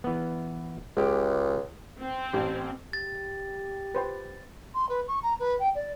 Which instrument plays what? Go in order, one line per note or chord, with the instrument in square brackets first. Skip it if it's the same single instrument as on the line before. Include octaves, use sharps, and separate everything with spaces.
[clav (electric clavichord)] E3 B3
[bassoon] C#2 [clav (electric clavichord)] G#3 G4
[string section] C4
[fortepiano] A1
[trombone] G4 [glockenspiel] A6
[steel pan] B4 C5 G5
[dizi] C6
B4
C#6
A#5
B4
G5
D5